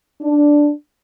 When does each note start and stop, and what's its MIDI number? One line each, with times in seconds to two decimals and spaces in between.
0.21 0.71 62